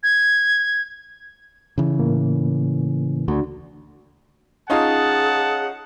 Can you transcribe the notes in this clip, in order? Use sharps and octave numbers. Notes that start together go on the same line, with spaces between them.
G#6
C#3 E3
A2 A#3
D2 D4 F#4
C#4 D#4 F4 G#4 F#5 A5